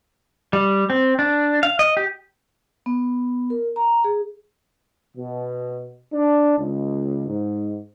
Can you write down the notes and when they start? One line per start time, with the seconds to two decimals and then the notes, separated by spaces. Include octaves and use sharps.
0.53 G3
0.90 C4
1.19 D4
1.63 F5
1.79 D#5
1.97 G4
2.86 B3
3.50 A#4
3.76 A#5
4.04 G#4
5.16 B2
6.13 D4
6.58 C#2
7.27 G#2